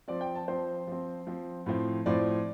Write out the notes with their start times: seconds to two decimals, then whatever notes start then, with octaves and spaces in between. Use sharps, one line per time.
0.08 F3 C4 D5
0.21 G5
0.35 A5
0.48 F3 C4 C5
0.87 F3 C4
1.27 F3 C4
1.66 A2 F3 C4
2.06 A2 F3 C4 D5